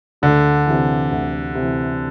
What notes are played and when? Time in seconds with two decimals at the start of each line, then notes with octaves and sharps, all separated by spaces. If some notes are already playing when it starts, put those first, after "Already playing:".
0.22 D2 D3
0.66 C3 E3
1.11 D2
1.55 C3 E3